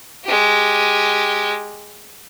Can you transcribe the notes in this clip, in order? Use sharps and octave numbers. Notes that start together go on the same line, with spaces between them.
G#3 G4